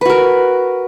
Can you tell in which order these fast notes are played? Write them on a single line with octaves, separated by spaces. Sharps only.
B4 F#4 A#4